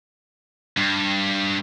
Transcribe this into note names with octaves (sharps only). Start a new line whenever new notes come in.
G2